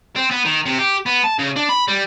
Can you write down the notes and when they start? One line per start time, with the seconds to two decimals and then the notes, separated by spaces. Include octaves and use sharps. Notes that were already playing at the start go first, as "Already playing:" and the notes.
0.16 C4
0.31 B3
0.45 D#3
0.66 C3
0.79 G4
1.06 B3
1.24 A5
1.39 C#3
1.56 D4
1.69 B5
1.88 G3